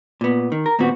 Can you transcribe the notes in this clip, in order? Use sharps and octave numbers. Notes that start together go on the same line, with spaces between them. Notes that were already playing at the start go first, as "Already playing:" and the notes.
A#2 B3
D#3
A#4
D#2 A#2 B3 C4 F#4